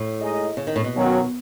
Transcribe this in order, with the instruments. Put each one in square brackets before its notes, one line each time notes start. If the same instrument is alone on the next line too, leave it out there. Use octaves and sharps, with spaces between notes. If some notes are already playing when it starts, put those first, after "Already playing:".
Already playing: [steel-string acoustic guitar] A2
[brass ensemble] G#3 D#4 G#4 D#5
[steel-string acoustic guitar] C#3
D#3
A2
B2
[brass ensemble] D#2 D#3 F#3 C#4